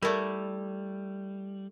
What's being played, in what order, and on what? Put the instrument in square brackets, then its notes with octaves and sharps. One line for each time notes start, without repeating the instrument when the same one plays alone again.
[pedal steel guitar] G3 [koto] A3 E4 [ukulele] A#4 D5